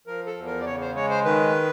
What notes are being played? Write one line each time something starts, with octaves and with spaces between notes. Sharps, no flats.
F3 A#4
A4
E2
A#4
D5
C#3 C#5
C5
G#3 C#5
C5
D#3 B4